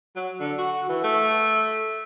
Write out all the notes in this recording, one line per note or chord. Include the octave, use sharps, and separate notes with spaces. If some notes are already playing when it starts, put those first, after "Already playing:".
F#3
D3
F#4
E3
A3